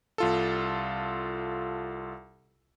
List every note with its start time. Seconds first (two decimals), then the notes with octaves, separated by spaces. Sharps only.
0.18 C2 F4 A4